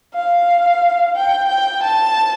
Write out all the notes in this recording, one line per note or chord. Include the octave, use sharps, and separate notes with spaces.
F5
G5
G5
A5